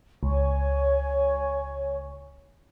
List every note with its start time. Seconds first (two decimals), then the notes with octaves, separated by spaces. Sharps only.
0.23 C#2 C#5 G#5 C#6